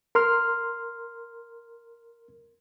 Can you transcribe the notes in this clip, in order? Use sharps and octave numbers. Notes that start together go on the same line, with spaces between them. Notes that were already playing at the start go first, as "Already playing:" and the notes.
A#4 C6 F6